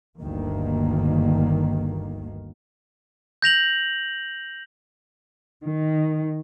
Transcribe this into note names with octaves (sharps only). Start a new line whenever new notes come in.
G1 D2 G2 D#3 A#3
G6 A#6 F7 F#7
D#3